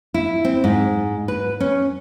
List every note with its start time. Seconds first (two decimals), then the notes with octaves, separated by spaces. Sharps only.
0.14 E4
0.45 C4
0.64 G#2
1.28 B4
1.60 C#4